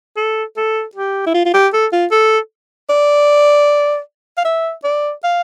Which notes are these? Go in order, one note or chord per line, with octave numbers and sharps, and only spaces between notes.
A4
A4
G4
E4
F4
F4
G4
A4
F4
A4
D5
F5
E5
D5
F5